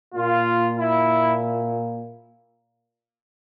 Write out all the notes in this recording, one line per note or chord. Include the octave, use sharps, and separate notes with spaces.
A#2 F4
E4